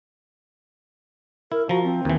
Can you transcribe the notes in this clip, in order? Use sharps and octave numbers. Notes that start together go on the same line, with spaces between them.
E4 A#4
F3 F#4 A#5
C4
D#2 E3